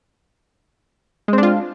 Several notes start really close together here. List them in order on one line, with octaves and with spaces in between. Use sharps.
G#3 C4 D4 F4